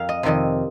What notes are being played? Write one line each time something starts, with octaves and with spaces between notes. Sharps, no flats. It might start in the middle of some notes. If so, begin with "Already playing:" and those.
Already playing: F2 A#4 F5
D#5
F2 C3 D#3 D#5